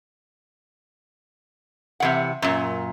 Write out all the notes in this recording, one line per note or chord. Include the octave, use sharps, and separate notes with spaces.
C3 E3 F#5
F#2 A#2